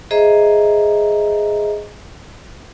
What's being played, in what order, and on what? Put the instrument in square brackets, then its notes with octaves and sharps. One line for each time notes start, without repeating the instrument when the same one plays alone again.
[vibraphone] G#4 C5 D#5 E5 A#5